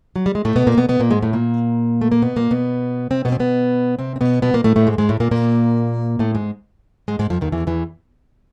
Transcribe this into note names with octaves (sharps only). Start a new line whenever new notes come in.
F#3
G3
G#3
A2 A3
B2 B3
A#2 A#3
B2 B3
B2 B3
A#2 A#3
G#2 G#3
A2 A3
A#2 A#3
A3
A#3
B2 B3
A#2 A#3
B2 B3
C3 C4
B2 B3
C4
B2 B3
C3 C4
C4
B2 B3
B2 B3
A#2 A#3
A2 A3
A2 A3
G#2 G#3
G#2 G#3
A2 A3
A#2 A#3
A#2 A#3
A2 A3
G#2 G#3
G#2 G#3
G#2 G#3
F2 F3
D#2 D#3
E2 E3
E2 E3